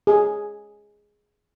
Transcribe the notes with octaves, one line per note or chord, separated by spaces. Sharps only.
G#4